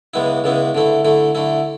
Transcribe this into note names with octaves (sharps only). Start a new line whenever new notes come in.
C#2 C#3 G#3 B3 E4
C#2 C#3 G#3 B3 E4
D3 A3 E4
D3 A3 E4
D3 A3 E4